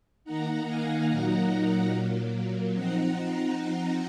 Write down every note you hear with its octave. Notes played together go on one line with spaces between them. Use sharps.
D#3 A#3 D#4 F#5 A#5
F5 G#5
A#2 F#3 A#3 D#4 F#5 A#5
A#2 F#3 A#3
F3 C4 D#4 F#5 A#5